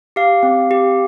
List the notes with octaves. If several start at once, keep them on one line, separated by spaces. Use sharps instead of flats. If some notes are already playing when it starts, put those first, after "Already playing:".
G4 F5
C4
G4